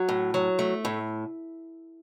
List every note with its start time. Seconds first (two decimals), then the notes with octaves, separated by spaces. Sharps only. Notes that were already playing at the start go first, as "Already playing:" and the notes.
Already playing: F#3
0.09 A2
0.34 F#3
0.59 A3
0.85 A2